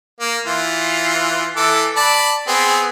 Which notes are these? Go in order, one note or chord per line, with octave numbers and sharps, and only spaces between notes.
A#3
E3 F4
E3 A4 D6
D5 A5 B5
B3 C4 G#4